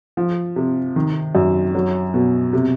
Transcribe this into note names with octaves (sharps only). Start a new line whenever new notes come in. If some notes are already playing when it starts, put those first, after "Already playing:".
F3
C3
D#3
F#2
F#3
B2
C3